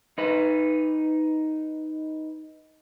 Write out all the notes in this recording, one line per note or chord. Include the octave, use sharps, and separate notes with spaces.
D#4 B4